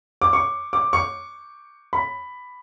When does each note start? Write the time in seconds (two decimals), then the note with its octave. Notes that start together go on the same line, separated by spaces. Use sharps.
0.22 D6
0.33 C#6
0.73 D6
0.93 C#6
1.93 B5